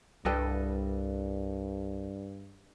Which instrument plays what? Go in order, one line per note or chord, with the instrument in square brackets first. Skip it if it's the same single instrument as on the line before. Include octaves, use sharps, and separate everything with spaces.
[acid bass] C2 [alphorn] G2 [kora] G3 A4 D#5 [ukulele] D4 B4 G5